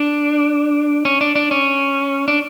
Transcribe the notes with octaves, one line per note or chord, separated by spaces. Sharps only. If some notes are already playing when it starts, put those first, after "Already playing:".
Already playing: D4
C#4
D4
D4
C#4
D4